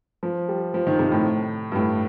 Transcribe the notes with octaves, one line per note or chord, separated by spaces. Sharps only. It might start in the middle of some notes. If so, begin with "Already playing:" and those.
F3
G3
F3
D#3
C3
A2
G2
A2